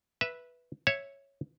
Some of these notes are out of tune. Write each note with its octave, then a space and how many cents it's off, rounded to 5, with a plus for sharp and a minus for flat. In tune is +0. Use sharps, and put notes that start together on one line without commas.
B4 -5 E5 +0
C#5 -5 E5 +0